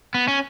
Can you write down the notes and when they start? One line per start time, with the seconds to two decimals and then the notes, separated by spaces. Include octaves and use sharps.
0.14 B3
0.28 C#4